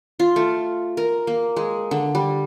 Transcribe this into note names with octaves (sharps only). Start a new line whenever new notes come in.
F4
A3
A#4
A#3
G#3
D3
G3